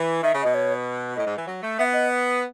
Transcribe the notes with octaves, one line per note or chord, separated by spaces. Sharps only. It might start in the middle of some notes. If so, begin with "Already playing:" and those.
Already playing: E3
D#3 E5
C#3
B2 D#5
C#5
A2 D#5
G#2
E3
F#3
A3
B3 E5
D#5